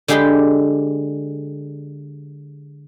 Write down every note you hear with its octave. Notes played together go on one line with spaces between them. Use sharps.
D3 G#3 G4 G#4 B5 C6